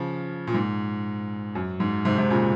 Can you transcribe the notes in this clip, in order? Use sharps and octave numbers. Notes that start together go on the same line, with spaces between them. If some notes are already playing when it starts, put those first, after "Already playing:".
Already playing: C#3 F3
A#2
G#2
F#2
G#2
G#2 C3
G#2 C3
A#2 C#3